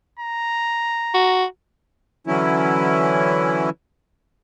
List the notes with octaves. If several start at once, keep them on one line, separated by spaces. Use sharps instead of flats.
A#5
F#4
D3 E3 F#3 C#4 E4